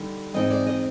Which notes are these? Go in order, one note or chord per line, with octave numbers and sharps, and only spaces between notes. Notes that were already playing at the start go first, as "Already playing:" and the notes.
Already playing: D3 G3 D#4
G#2 E3 G#3 C4 D#4 D#5
D5
D#5